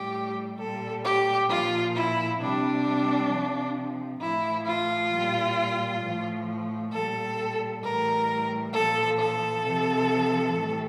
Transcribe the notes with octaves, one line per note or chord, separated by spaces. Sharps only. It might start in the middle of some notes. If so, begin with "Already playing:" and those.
Already playing: A2 G3 G4
A#2 G3 A4
G4
A#2 F3 F4
E4
C3 G3 D4
C3 F3
A2 F3 E4
F4
A#2 G3
A2 F3
A#2 G3 A4
A2 E3 G3 A#4
A#2 F3 A4
A4
C3 F3
A2 E3 G3